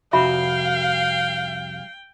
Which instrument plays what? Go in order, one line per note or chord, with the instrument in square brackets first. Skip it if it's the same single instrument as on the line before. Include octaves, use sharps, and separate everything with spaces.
[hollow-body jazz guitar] C2 F2 F#4 [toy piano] E5 B5 [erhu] F5 [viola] G5